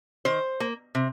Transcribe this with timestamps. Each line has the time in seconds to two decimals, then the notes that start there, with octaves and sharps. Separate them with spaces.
0.25 D#3 C5
0.60 A#3
0.95 C3